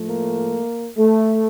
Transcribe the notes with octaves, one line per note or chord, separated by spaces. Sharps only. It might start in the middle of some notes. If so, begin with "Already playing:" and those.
Already playing: A2 F3 A3
A#3
A3